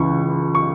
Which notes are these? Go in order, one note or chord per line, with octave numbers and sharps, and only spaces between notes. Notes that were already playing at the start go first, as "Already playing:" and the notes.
Already playing: C#2 C#3 E3 C#6
C#6